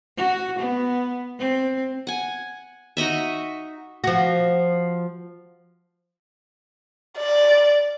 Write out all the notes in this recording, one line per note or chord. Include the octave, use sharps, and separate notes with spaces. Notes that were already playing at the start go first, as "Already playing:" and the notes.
F#4
B3
C4
F#5 G#5
D#4 F#4 D#5 E5
F3 F#4
D5